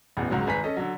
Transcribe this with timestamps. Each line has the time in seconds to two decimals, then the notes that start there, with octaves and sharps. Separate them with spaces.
0.17 A1 E2 B2
0.31 C#2 G#2 F#3
0.47 G#1 B4 G#5 A#5 B6
0.64 C#4 A4 D#5
0.77 D3 F#3